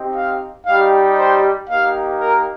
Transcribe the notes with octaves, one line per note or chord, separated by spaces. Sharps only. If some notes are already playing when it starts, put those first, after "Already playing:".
Already playing: C4 D#4 G4
F5
G3 D#4 G4 F5
C5
A#3 D#4 G4 F5
A#4